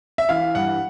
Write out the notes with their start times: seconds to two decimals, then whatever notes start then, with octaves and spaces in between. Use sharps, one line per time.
0.18 E5
0.29 E3 F5
0.55 G2 F#5